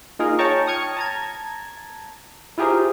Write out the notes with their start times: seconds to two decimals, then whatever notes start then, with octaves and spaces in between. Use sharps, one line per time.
0.19 A#3 D#4 F4 G#4 A#4
0.39 C#5 G5 A5 A#5 C#6
0.67 D#6 F6 G#6 C#7
0.97 A5 A#5 G#6
2.58 E4 F4 G4 G#4 A#4 C5